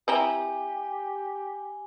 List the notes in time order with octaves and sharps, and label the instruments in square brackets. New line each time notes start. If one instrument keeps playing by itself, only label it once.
[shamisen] C4 E4 A#5 [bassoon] G4 [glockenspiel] G#5 G7